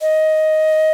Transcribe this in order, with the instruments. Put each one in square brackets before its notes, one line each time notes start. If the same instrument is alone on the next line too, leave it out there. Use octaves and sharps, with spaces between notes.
[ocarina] D#5